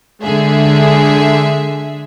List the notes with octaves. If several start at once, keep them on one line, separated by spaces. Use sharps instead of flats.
D3 G#3 G#4 E5